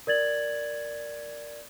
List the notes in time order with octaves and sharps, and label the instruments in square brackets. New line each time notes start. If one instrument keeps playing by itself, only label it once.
[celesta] A#4 D5 G#6 A6 F#7